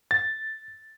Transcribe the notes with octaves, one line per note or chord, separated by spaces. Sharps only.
A6